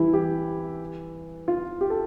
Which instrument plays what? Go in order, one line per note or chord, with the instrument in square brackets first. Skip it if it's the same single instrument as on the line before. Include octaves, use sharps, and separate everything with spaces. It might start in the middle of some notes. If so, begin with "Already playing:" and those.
Already playing: [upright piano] E3 G3 [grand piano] E4
[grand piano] G4
F4
G4
A4